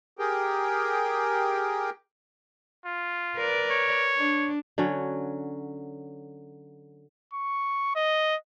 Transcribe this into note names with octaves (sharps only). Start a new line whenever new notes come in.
G4 G#4 A#4 G5
F4
A#4 B4 D5
C#5
D4
D3 F#3 C#4
C#6
D#5